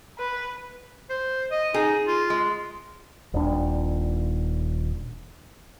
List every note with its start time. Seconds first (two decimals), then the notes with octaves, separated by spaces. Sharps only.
0.19 B4
1.10 C5
1.51 D#5
1.74 D#4 G#4
2.07 F4
2.30 G#3
3.34 D#1 D4